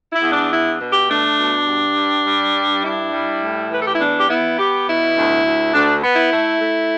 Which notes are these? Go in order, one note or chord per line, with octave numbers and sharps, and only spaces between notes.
E4
E2
D4
D4 E4
B2
G4
A3 D4
B2
G2
G3
G3
G2
D4 E4
G3
A2
E3 B4
A4
G4
E4
E2 D4
G4
B3 E4
B3 G4
B2 E4
D2
D2
D2 D4
B3
E4
A3
A3